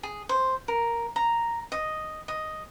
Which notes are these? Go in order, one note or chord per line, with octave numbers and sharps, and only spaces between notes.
G#4
C5
A#4
A#5
D#5
D#5